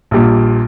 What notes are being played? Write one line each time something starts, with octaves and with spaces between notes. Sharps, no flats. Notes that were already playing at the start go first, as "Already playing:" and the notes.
A#1 A#2 G3